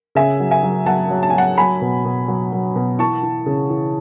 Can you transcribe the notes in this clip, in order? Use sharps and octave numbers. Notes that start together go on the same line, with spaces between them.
C#3 E5 G#5
F#3
E5 G#5
F#3
F#3 F#5 A5
F#3
A5
G#5
F#3 F#5 A5
F#3 G#5 B5
B2
B2
F#3
F#3
B2
E3 A5 C#6
E3
C#3
E3